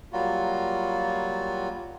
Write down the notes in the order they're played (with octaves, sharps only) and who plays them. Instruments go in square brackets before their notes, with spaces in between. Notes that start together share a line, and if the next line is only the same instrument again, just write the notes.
[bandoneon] F#3 G3 A#3 F4 F#4